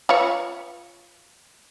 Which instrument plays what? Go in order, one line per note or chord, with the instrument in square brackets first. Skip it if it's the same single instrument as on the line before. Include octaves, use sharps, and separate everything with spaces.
[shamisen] F4 B4 C#5